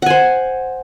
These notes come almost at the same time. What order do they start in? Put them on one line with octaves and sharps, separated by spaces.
F#5 G#5 C5